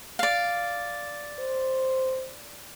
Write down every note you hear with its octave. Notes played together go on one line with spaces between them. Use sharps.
D5 F5
C5